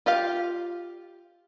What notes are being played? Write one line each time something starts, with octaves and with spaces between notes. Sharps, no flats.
F4 G4 F5